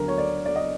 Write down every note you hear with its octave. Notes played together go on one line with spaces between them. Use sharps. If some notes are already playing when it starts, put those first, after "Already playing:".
Already playing: D2 D3 F#3 A#4
C#5
D5
D5
D#5